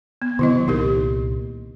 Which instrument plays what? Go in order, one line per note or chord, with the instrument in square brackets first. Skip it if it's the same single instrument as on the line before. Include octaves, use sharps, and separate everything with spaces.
[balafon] B3
[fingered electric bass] C3 F#3 [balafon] D#3 E4 D#5
[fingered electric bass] C2 A#2 [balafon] D#4 G4 A#4